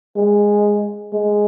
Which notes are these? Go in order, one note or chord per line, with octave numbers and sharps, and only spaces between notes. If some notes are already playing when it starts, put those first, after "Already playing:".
G#3
G#3